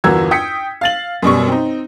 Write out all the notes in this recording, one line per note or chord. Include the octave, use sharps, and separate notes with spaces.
G1 E2 F#4 A#4 E6 G#6
G5 D#6 B6 C#7
F5 A6 F#7
F#2 B2 G3 C#6
C4 D#4